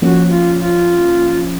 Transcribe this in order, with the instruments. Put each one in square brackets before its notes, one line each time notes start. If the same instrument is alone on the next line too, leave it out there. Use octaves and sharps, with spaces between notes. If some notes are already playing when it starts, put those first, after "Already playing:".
[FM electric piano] F3 A#3 C#4 [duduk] F#4
[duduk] F4
F4